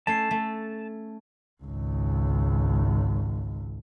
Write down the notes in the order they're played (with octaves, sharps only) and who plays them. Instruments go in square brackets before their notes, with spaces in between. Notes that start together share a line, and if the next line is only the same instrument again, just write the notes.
[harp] A3 C#4 C7 [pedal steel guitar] A5
[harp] A3
[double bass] G#1 C#2